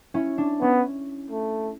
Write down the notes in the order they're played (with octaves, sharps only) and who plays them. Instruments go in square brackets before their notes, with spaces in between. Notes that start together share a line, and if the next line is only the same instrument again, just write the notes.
[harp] C#4 E4
D4
[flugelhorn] B3 [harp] C#4
[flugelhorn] A3